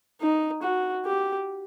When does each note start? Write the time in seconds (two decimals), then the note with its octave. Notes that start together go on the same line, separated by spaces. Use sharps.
0.21 D#4
0.63 F#4
1.05 G4